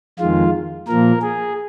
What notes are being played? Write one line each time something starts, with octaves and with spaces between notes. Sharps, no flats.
F2 D#3 G#3 F4
A#2 F3 A#3 A#4
G#4